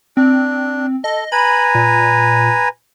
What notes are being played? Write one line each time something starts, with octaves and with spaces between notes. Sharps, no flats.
C4 D4
A4 D#5
B4 G#5 A#5 B5
A#2